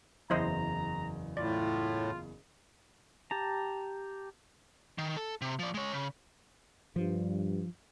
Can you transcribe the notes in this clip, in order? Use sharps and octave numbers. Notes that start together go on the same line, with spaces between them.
F#1 E2 E4 C5 D#5 A#5
A2 F4 D5
G4 A5 A#5
D#3
A4
C3
F3 D5
G#3 C#5
C#3
G2 F3